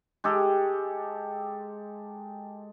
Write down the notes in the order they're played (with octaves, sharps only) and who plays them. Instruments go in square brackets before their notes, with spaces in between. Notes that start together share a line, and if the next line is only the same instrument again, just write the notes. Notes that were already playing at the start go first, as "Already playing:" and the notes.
[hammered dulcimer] G#3 G4 A4